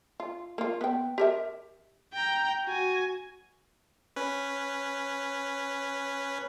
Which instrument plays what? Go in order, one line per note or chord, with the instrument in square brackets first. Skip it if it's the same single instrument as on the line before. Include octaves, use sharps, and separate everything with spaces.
[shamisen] F4
A#3 F4
B3 G5
G4 A#4 E5
[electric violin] G5 A#5
F#4 G#5
[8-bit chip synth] C#4 B4